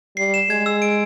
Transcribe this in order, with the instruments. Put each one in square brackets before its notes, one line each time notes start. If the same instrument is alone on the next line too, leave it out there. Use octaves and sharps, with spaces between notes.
[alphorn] G3 [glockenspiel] C7
[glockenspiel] E7
[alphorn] G#3 [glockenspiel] G#6
[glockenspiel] E6
D7